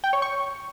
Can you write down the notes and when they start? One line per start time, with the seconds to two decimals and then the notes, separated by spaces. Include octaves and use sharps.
0.04 G5
0.13 C#5
0.22 C#6